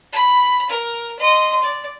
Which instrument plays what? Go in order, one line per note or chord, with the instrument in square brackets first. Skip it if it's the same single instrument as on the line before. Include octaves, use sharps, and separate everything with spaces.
[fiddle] B5
A#4
D#5 C6
D5